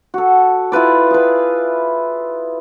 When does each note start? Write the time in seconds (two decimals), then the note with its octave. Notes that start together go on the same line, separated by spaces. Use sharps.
0.14 F#4 A4
0.72 E4 F4 B4 D5
1.11 G#4 B4